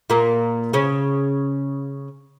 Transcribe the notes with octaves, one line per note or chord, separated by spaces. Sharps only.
A#2 A#3
C#3 C#4